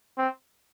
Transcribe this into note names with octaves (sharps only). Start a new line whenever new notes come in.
C4